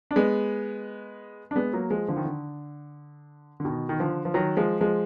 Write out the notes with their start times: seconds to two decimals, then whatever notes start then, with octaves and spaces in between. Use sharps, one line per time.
0.11 D4
0.16 G#3 B3
1.51 D4
1.56 G#3 B3
1.73 F#3 A#3
1.90 F3 G#3
2.08 D3 F3
2.17 D#3
2.25 D3
3.60 D3
3.65 B2 D#3
3.89 D#3
3.99 D3 F3
4.25 F3
4.34 D#3 F#3
4.57 F3 G#3
4.81 F3 G#3